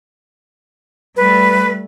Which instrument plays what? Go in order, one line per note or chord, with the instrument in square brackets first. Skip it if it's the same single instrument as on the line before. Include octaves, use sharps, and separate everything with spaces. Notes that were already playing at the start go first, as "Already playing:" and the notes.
[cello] G3 A3 [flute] B4